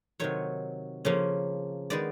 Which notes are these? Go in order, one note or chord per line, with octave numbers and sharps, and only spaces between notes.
C3 D#3 F#3 C#5
C#3 F3 A#3 C#4
D#3 G#3 B3 D5